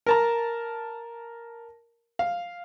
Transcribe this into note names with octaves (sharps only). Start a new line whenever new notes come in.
A#4 A5 A#5
F5